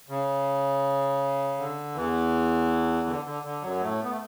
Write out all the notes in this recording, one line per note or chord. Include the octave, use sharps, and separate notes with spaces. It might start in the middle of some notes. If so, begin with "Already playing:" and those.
C#3
D3
E2 E3
D3
D3
D3
F#2 F#3
A2 A3
B3
A3